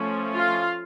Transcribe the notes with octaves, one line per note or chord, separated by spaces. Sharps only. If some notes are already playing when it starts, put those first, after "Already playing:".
Already playing: F3 A3 C#4
F4 F5